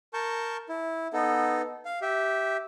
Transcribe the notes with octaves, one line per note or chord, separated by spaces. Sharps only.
A#4 A5 C#6 G6
E4
B3 D#4 A4
F5
G4 E5